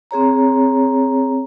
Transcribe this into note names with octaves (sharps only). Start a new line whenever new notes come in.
C4 G#4 C#5 A#5